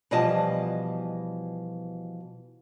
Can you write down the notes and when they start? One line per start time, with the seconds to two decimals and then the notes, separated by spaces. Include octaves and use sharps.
0.11 B2 E3 F3 G3 D#5 A5